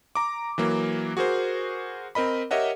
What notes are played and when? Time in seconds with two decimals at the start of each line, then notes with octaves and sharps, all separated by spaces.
0.15 A#5 D6
0.58 E3 F#3 A#3
1.17 F#4 G#4 A#4 C5
2.15 C4 A#4 D#5 B5
2.51 G4 A#4 C#5 D#5 E5 F#5